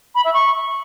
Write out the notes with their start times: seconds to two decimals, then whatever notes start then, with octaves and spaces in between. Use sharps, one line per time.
0.15 B5
0.24 E5
0.34 C#6